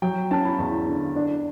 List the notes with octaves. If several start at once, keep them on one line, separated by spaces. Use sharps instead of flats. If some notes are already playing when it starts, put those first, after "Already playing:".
F#3 G5
C#4 A5
B5
E2
D3
D4